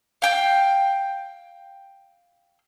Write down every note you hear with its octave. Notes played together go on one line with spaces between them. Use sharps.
F5 G5 G6